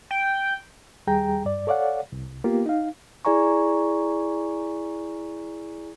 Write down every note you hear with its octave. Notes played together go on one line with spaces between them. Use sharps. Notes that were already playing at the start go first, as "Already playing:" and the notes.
G5
D#2 G3 G#4 G5 A#5
G2 D5
A4 C#5 D5 F5 F#5
C2
A#3 B3 F4 G4
D#4 F5
E4 G#4 D5 G#5 A#5 C#6